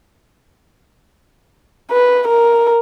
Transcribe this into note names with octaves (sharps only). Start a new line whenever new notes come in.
B4
A#4